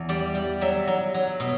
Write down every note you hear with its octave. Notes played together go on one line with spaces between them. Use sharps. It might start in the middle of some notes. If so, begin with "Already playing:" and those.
Already playing: E2
G3 D5
G3
F#3 E5
F#3
F#3
B2